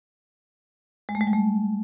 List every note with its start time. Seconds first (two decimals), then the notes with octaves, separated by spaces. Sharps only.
1.09 G#3
1.15 A3
1.21 G#3
1.27 G3
1.33 A3